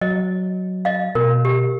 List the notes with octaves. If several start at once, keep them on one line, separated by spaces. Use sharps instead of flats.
F#3 D#5
D#5 F5
B2 A#4
G4